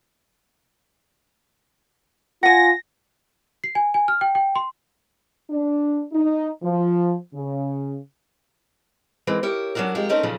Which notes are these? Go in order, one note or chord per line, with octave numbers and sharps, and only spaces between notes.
F4 F#5 G#5 A#6
C7
G#5
G#5
F6
G5
G5
C6
D4
D#4
F3
C#3
E3 G#3 A#3 C4
G4 A#4 C#5 E5
F#3 C#4 D4 F#4 A#4
F2 G#3 F4 G4 A#4
A3 C4 C#4 D#4 A#4 D#5
A#2 C#3 F3 F#3 A3